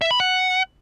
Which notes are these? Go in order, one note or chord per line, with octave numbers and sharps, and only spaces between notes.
E5
B5
F#5